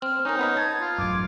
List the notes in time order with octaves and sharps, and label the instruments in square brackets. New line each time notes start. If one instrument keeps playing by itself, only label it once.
[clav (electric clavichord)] C4 [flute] F6
[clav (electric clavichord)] C#4 A#4 [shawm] D#4 [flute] C5
[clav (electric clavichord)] B3 B4 D#5 [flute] C#5
[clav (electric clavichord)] A5 [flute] G#6
[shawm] F4
[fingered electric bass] A1 F#2 [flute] D6